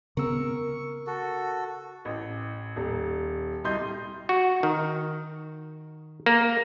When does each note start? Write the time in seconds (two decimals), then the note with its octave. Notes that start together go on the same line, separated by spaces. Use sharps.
0.17 C#3 B3 C4 A#4 C#6 E6
1.07 F#4 A4
2.05 A1
2.76 D#1
3.64 C2 G3 D#5 C6 G6
4.29 F#4
4.63 D#3
6.26 A#3